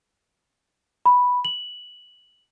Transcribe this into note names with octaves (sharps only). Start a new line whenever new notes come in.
B5
F#7